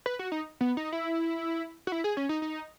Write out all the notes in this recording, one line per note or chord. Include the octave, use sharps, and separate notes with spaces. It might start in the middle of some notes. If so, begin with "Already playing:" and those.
B4
F#4
D#4
B3
D#4
E4
F#4
E4
G#4
C#4
D#4
D#4